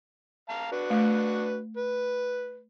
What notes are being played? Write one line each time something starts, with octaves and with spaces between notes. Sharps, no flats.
F5 A5 A#5
D4 F#4 B4
A3
B4